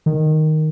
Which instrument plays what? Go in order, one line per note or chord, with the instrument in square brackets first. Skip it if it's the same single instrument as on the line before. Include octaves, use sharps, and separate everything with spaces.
[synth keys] D#3